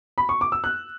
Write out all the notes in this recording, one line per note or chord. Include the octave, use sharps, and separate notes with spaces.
B5
C#6
D6
E6
F#6